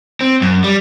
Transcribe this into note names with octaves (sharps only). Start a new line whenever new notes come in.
C4
F#2
G3